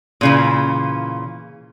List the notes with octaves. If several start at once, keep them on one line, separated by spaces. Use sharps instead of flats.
A#2 C#3 E3